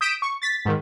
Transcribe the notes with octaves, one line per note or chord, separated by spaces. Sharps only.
D#6 G6 B6 D7 E7
C#6
A6 B6
G#2 D#3